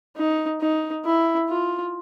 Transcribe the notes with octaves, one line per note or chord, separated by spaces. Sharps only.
D#4
D#4
E4
F4